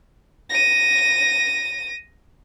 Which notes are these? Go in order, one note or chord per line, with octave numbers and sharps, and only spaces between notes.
A#6 D#7